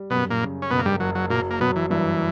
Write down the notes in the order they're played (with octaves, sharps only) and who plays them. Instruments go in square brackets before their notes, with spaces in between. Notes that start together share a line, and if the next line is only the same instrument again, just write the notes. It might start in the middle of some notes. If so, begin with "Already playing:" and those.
Already playing: [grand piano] G3
[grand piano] F#2 [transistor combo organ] B2 B3
[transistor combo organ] A#2 A#3
[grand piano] C#3
[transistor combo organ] C#4
[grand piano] F#1 [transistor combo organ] B2 B3
[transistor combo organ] A#3
G2 G3
[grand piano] F#1 [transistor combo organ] F#3
[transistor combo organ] F#3
[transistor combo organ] A#2 A#3 [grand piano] F#3
[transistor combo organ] A#3
[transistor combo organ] B2 B3 [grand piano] F#3
[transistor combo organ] E3
[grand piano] G2 [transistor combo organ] E3